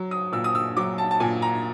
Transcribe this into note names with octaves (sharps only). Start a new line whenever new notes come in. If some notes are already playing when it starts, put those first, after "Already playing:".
Already playing: F#3
D#6
A#2 E6
D#6
E6
F#3 D6
A5
A5
A#2 G#5
A#5